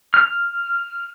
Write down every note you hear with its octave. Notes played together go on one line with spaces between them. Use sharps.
F6